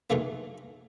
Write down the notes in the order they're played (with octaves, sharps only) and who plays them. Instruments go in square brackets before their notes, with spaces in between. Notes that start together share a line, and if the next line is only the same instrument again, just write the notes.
[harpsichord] B1 E2 E3 A3 A#3